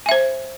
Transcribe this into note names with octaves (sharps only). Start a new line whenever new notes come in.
C5 E5 G#5